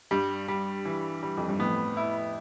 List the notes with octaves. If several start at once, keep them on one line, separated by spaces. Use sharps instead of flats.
G2 G3
G3
E3
G3
F2
G2
F2 A2 B3
E4